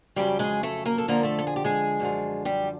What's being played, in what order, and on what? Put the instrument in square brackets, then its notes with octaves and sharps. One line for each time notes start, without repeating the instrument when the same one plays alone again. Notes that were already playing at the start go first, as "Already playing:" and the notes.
[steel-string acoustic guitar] F2 C#3 F#3 G3 G4
G#3 G#4
A3 A4
A#3 A#4
A4
F2 D3 F3 A#3 A#4
A3 A4
A4
G#4
G4
G#3 G#4
F#2 D3 F3
G3 G4